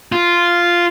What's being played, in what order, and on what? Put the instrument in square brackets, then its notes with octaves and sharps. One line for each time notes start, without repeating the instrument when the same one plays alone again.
[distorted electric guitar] F4